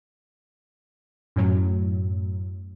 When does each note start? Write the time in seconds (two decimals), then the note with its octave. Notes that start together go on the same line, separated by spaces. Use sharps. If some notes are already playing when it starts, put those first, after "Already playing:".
1.36 F#2 A2 F#3